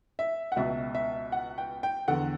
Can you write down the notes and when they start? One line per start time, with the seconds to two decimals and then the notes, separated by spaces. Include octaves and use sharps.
0.19 E5
0.52 F#5
0.56 C#2 B2 E5
0.95 E5
1.32 F#5
1.58 G5
1.83 G5
2.08 E2 D3 F#5